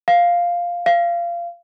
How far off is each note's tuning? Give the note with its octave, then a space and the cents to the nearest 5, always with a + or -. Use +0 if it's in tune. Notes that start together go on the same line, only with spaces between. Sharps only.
F5 +0
F5 -25